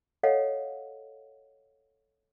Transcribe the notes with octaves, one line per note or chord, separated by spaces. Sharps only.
A4 C#5 D#5 F5 F#5